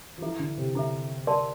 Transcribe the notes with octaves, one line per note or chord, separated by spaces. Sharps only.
F3
E3 E4 A4 E5
D3
C3
D3 E4 A4 E5
A#4 D5 A5 C6